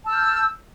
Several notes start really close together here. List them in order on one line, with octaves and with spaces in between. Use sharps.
A5 E6 G6 F6